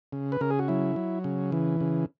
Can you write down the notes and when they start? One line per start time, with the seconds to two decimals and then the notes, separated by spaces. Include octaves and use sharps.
0.13 C#3
0.32 B4
0.41 C#3 A#4
0.50 G#4
0.59 F#4
0.68 F#3 E4
0.96 F#3
1.24 C#3
1.52 E3
1.81 C#3